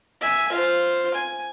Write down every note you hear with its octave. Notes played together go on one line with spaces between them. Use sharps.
E5 G#5
F4 C5
G#5